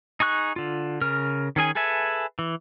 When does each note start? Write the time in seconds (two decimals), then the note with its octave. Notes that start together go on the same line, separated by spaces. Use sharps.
0.20 D#4 G#4 C#6 F#6
0.56 D3 F4
1.01 C#3 A#4 F6
1.56 D#3 C#4 G#4 G#5
1.75 G#4 A4 B4 E5 G#5
2.39 E3